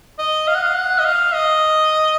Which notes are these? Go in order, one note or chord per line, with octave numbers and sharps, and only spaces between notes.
D#5
F5
F#5
F5
F#5
D#5
F5
D#5